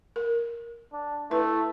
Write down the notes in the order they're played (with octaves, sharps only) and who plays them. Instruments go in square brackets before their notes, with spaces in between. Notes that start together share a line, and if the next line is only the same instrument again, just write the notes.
[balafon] A#4
[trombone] D4
[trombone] A3 [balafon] E4 B4